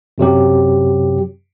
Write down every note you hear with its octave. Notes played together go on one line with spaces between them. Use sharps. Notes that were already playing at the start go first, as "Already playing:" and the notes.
F#2 C3 F#3 G4